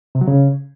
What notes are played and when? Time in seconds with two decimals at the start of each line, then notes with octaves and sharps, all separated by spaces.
0.15 C3
0.21 F#3
0.28 C#3